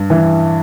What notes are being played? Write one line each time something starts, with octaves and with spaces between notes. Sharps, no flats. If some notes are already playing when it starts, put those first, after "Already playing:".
Already playing: G2
E3